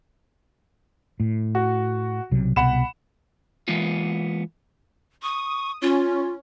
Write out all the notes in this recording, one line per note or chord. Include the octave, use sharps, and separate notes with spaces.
A2
F#4
B1 C3 F#3
C2 B2 F#5 B5 E7
E3 G#3 A#3 B3 F4
C#6 D#6
C#4 F4